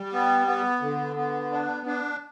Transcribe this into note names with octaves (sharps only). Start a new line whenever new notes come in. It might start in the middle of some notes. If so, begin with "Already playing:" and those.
Already playing: G3
B3
B3
D3
B3
D4
D4